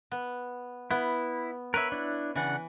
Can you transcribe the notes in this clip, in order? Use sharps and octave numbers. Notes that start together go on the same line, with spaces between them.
B3
B3 E4
A#4 B4 C#5 E5
D4 E4
C#3 E3 D4 F#5